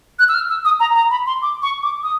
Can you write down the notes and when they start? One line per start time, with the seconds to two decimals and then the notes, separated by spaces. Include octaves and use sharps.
0.19 F#6
0.28 E6
0.34 F6
0.49 E6
0.65 D#6
0.80 A#5
0.95 A#5
1.10 B5
1.26 C6
1.42 D6
1.62 C#6
1.83 D6
2.03 D#6